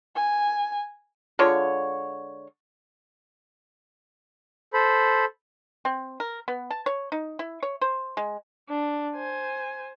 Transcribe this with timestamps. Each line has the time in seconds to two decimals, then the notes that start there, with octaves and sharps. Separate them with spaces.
0.16 G#5
1.39 D3 G#3 F4 C#5
4.73 A4 C5 B5
5.85 C4
6.20 A#4
6.48 B3
6.70 A5
6.86 C#5
7.12 D#4
7.39 E4
7.63 C#5
7.81 C5
8.17 G#3
8.69 D4
9.15 C5 G#5